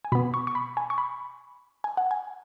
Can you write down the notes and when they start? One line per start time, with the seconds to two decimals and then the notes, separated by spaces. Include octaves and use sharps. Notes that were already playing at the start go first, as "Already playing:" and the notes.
0.05 G#5
0.12 B2 B3 B5
0.34 C#6
0.47 C#6
0.55 B5
0.77 G#5
0.90 C#6
0.98 B5
1.84 G#5
1.97 F#5
2.11 G#5